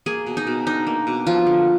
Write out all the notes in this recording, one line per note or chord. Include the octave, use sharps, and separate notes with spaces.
A#3 G#4
B2
D#4
B2
D4 D#4
A#3
B2
F3 F4
D3